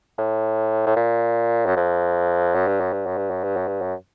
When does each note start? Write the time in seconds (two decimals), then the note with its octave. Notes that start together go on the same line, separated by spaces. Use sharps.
0.18 A2
0.86 A2
0.96 A#2
1.66 F#2
1.77 F2
2.55 F#2
2.67 G2
2.80 F#2
2.93 G2
3.06 F#2
3.17 G2
3.30 F#2
3.44 G2
3.56 F#2
3.68 G2
3.81 F#2